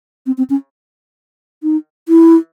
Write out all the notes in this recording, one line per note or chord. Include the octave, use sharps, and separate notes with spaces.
C4
C4
C#4
D#4
E4